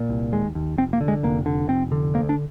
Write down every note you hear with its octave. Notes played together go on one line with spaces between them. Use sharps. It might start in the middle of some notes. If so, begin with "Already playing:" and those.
Already playing: A#2
C2
D#2 G#3
D#2
F1 C4
A#3
D3
G#3
F1 A#3
D3
F1 C4
D3
D2 A#3
D4